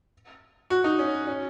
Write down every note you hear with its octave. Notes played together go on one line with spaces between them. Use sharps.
F#4
D#4
C#4
C#4